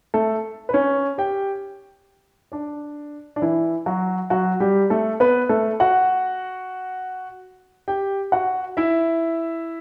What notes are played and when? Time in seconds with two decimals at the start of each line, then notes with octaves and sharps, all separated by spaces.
0.14 A3 A4
0.69 B4
0.73 C#4 C#5
1.18 G4 G5
2.52 D4 D5
3.36 D4
3.42 E3 E4
3.86 F#3 F#4
4.30 F#3 F#4
4.60 G3 G4
4.90 A3 A4
5.20 B3 B4
5.49 A3 A4
5.80 F#4 F#5
7.88 G4 G5
8.32 F#4 F#5
8.77 E4 E5